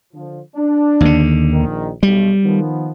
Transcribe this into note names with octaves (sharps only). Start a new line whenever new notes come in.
D3 F3
D4
D#2 D3
A#1 D#3
B1 G3
D#3 F3 B3